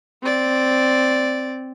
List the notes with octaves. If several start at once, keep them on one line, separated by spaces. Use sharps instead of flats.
C4 D5